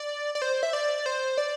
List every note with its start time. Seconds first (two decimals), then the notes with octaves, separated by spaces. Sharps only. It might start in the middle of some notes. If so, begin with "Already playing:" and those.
Already playing: D5
0.35 D5
0.42 C5
0.63 E5
0.73 D5
1.06 C5
1.38 D5